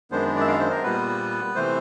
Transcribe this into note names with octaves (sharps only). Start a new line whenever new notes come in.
F#2 D#3 G#3 B3 D4 C5
D5 E5
F5
C5
A#4
A#2 G3 B3 B4
C3 E3 A3 C5